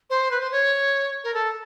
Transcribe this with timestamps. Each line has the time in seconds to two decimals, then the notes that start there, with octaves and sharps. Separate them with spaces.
0.10 C5
0.31 B4
0.40 C5
0.52 C#5
1.24 A#4
1.34 A4